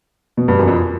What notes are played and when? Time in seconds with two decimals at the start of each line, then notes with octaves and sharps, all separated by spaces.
0.37 B2
0.48 G2
0.59 F#2
0.68 F2